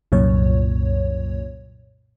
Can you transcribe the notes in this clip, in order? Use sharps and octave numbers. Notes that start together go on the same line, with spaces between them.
C2 F#2 A#2 C#5